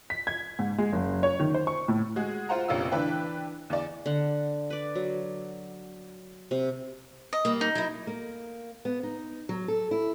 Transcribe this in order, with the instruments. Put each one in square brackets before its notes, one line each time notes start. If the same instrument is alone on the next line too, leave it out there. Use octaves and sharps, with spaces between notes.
[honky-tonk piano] B6
G#6
G#2
G#3
F#1
C#5
D#3
C5
C#6
A2
G#3 F#4 G#4
F4 C5 F#5 A#5
F1 A#1 A#3 C#4 F4 E6
E3 D4 B4 G5
E2 D5
[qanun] D3 F#5
B4 D5
F#3
C3
[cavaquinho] D#5
[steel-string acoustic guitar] G3 A#3
[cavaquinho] D#4
[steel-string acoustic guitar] F#3 E4
A#3
B3
D#4
F#3
A4
E4